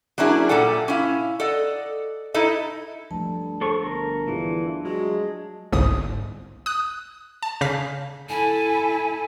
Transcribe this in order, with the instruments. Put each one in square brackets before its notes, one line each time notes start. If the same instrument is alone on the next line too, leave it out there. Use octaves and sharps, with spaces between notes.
[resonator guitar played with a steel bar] F#3 A#3 C#4 D4 E4 G#4
A#2 G3 G4 A4 F#5
C#4 E4 F5
A4 D5 D#5 F#5
D#4 E4 A4 D#5
[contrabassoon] G2 [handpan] F3 A3 [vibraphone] A5
[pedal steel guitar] A4 C5 C#6
[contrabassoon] G1 [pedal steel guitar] A#4
[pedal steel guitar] E3 [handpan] D4 F4 G#4
[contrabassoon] F#3 [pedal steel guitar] G#3
[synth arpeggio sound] G1 C2 G#2 D#6
D#6 F#6
A5
C#3 F5 B6
[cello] E4 A4 [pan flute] G#5